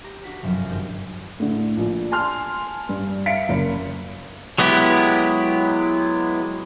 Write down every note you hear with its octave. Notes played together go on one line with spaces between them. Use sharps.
G4 A#5
D4 F#4 B6
G1 F#2 C3 F3 F#3
G#1 G3 G6 E7
A2 D3
A#1
G#5 A5 C6 F6
G2
E5 F5 B6 C#7 D7
F#1 A#4
F#3 G#3 B3 E4 G4